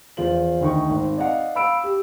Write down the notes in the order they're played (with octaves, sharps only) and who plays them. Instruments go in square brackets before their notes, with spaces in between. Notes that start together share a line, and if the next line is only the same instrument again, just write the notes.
[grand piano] E2 F3 F4 C5 F#7
D2 D#3 C#6
G#1 C4
D5 D#5 F5 F#5
F5 B5 E6 D7
G4